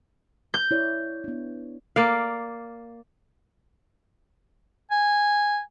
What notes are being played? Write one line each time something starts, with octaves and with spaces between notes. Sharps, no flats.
G6
E4 C#5 D5
B3 D4
A#3 D5 F5
G#5